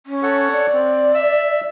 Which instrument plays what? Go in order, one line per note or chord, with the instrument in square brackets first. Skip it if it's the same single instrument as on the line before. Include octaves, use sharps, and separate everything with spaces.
[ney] C#4
[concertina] A4 C#5 F#5
[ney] D5
[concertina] C4
E5 E6